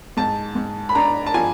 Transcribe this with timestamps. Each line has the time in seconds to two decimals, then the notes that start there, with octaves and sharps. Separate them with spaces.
0.17 G#2 A5
0.55 G#2
0.89 B5
0.95 D4 A#5
1.26 A5
1.34 F3 G#5